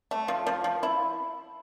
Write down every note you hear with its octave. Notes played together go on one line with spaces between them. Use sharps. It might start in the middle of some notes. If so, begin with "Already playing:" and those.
A3
F3
F3
F3
E4